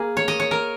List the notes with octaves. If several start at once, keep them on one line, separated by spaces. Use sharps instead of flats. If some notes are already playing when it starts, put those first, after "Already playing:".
Already playing: A#3 G#4
C#5
D#5
C#5
A#4